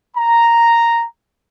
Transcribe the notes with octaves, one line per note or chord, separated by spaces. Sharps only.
A#5